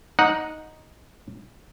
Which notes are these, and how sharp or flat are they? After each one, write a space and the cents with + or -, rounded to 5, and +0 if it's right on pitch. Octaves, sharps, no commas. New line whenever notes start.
D#4 +0 F#5 -15